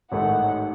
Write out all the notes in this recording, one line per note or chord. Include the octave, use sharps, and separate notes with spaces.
A1 G#2 D#3 A3 D#4 F#5